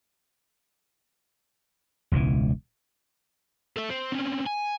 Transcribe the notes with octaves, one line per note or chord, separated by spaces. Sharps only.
E1 C#2 C#3 E3
A4 E5
C4
C4 C#4
G#5